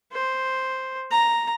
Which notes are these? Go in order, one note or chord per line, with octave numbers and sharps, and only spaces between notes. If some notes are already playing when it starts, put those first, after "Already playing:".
C5
A#5